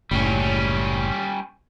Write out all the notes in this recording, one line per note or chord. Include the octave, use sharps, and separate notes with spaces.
F#1 A2 G3 C#4